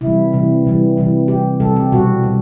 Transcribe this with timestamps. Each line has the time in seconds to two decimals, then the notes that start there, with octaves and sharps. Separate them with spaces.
0.01 C3 E3 G3 E4
0.33 C3 E3 G3
0.65 C3 E3 G3
0.97 C3 E3 G3
1.28 C3 G3 G4
1.60 C3 G3 A4
1.76 G4
1.92 B2 G3 F#4
2.23 B2 G3